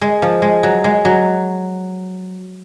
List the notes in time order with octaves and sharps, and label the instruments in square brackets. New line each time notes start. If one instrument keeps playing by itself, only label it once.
[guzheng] G#3
F3
G#3
F#3
G#3
F#3